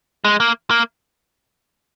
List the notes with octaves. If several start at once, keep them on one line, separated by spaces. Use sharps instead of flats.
G#3
A#3
A#3